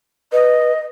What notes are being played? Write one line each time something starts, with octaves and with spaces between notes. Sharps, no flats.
B4 D#5